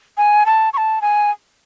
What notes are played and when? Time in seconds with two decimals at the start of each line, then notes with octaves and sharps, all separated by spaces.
0.17 G#5
0.46 A5
0.73 C#6
0.77 A5
1.02 G#5